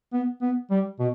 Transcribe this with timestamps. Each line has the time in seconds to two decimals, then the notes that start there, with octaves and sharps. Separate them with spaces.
0.13 B3
0.42 B3
0.71 G3
0.99 B2